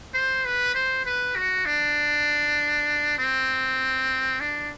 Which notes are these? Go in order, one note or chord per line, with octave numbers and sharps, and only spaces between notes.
C5
B4
C5
B4
F#4
D4
C4
D4